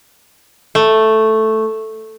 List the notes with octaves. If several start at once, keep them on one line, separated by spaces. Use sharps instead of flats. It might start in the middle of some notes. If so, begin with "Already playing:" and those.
A3